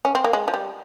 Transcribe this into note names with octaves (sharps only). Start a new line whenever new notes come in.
C#4
C4
A#3
G#3
F3
G3